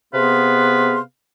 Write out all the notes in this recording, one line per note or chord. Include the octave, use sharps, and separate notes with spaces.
C3 B3 G#4 B4 F5 C6